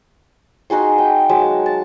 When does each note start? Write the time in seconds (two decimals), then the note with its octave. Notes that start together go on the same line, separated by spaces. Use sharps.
0.70 D#4 F#4 G#4 C6
0.98 G5
1.29 F#3 G#3 A5
1.66 A5